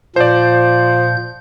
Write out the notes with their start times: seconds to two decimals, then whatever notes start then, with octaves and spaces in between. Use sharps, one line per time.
0.16 A#2 F3 C5 D5 G6